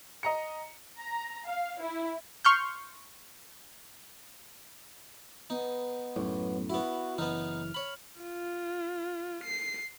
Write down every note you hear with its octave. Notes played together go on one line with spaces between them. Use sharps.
D#5 A#5 C#7
A#5
F5
E4
C6 C#6 F6 G6
B3 D#4
B1 F#2 A2
B3 E4 F#4
F#1 E3 B3 D#4 F6
C#5 B5
F4
C7